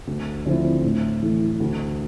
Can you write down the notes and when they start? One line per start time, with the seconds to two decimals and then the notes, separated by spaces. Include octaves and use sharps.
0.07 D2
0.46 D3 F3 C4 E4
0.84 A2
1.22 E3 A3 E4
1.60 D2